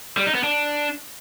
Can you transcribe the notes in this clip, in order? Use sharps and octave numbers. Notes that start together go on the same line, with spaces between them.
G3
D#4
B3
D4